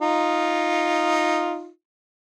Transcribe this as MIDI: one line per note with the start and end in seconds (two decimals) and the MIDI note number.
0.01 1.68 63
0.01 1.68 65